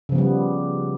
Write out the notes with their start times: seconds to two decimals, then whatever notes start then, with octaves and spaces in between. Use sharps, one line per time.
0.09 C#3
0.12 F3
0.15 B3
0.18 G3